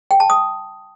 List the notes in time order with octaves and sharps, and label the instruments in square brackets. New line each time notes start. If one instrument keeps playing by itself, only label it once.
[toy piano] G5
A5
D#6